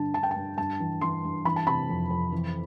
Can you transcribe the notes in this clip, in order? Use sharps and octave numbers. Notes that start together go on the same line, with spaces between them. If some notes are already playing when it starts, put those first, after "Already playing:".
Already playing: G2 D3 A5
D3 A5
G5
A5
G2
G2 A5
E3
E3 C6
G2
E3 B5
A5
C3 B5
F2
F2
E3